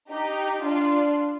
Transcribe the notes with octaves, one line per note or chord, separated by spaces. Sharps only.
D#4 G4
D4 F4